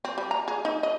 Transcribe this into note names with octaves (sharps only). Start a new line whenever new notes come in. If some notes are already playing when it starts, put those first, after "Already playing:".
C4
G3
A#5
G#4
D#4
D#5